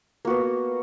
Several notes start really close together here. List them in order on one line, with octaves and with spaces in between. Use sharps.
A#3 F#4 B3